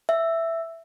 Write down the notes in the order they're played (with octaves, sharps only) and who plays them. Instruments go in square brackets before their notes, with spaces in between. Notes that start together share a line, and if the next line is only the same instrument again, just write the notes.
[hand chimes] E5